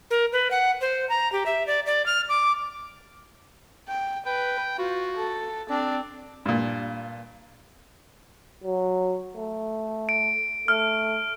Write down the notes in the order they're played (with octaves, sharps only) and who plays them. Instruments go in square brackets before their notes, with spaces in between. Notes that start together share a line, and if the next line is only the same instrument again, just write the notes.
[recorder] A#4
B4
F#5
C5
A#5
G4
E5
D5
D5
F6
D6
[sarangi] G5
[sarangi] B4 [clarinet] G5
[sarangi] F4 [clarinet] F#4
[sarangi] A4
[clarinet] C4 [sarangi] D4
[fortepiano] G2 A#2
[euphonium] F#3
A3
[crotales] D7
[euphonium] A3 [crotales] F6